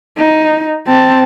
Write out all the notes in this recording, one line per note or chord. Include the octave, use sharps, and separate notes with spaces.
D#4
C4 A5